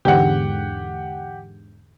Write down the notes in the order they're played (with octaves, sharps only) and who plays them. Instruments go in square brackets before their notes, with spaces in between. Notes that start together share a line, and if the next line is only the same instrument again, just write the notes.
[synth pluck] E2 G#2 D3 [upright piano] G4 F#5